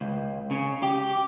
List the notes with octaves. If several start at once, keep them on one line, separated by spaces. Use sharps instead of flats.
C#2
C#3
G4